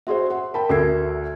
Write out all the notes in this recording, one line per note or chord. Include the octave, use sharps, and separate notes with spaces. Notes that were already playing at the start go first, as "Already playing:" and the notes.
F#4 G#4 C5 E5 C6
F#5
A#4 G5 A5 B5
D2 A4 E5 E6 G#6 C7